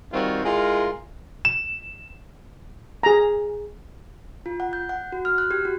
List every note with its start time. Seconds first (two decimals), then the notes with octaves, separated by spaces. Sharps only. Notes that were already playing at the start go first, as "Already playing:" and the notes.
0.12 D#3 G3 C4 F4 F#4
0.43 G#3 E4 F4 A#4 F5
1.45 E7
3.03 G#4 A#5
4.46 F4
4.60 F#5
4.73 G6
4.89 F#5
5.12 F#4
5.25 F6
5.38 F#6
5.51 G4
5.65 F#4